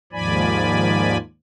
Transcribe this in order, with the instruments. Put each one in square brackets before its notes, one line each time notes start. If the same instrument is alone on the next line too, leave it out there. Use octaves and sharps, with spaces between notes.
[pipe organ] D#2 G#2 F3 D5 G#5 B5